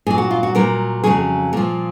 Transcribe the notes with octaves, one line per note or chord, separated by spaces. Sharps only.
A#2 F#3 G#4
F#4
F4
F#4
A#2 F#3 A#4
F2 C#3 F#3 G#4
A#2 F3